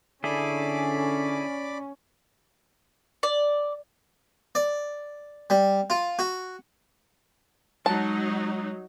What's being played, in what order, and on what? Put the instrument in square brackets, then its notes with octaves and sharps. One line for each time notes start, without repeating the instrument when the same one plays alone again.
[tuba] D3 [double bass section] C#4 [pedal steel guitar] E4 G#4 A4 [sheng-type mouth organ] D5 B5 D6
[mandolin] D5
[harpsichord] D5
G3
F4
F#4
[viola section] F#3 D#4 [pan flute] G#3 [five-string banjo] A5